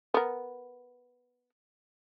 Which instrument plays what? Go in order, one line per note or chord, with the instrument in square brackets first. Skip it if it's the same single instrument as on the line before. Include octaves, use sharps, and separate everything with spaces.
[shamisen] B3 A#4